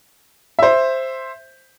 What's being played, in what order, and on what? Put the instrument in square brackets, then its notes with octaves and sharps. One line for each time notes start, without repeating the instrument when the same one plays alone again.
[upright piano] C5 E5